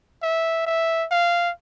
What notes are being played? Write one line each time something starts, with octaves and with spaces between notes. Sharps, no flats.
E5
E5
F5